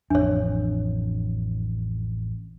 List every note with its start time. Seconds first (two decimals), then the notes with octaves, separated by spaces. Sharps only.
0.10 A1 F2 D4 C#5